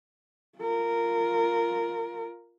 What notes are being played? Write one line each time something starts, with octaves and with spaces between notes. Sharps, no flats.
F4 A#4